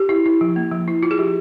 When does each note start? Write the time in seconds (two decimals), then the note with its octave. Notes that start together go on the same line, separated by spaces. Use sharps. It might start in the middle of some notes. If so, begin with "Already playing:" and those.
Already playing: G4
0.09 E4
0.26 E4
0.41 F3
0.56 A#3
0.72 F3
0.88 E4
1.03 E4 F4
1.11 G#4
1.18 F3 G4